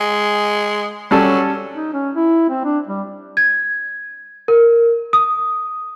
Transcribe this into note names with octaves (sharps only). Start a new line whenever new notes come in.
G#3
F#3 G3 C#4 A4
D#4
C#4
E4
C4
D4
G3
G#6
A#4
D#6